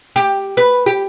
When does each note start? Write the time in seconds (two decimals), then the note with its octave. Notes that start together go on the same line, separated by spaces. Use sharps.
0.16 G4
0.57 B4
0.86 G4